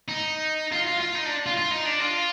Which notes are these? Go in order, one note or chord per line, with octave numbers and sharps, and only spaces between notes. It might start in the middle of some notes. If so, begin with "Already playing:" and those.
D#4
F4
F4
F4
D#4
D4
F4
F4
D#4
D4
F4